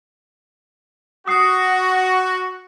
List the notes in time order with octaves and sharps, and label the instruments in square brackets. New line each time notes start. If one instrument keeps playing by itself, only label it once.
[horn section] F#4 [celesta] D#6 C7